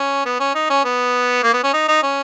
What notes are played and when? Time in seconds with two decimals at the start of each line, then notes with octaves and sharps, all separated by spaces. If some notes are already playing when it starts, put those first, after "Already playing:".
Already playing: C#4
0.25 B3
0.40 C#4
0.55 D#4
0.70 C#4
0.85 B3
1.44 A#3
1.54 B3
1.64 C#4
1.74 D#4
1.88 D#4
2.03 C#4